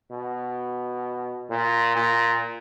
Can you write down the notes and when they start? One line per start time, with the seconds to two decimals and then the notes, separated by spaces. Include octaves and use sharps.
0.11 B2
1.50 A#2
1.96 A#2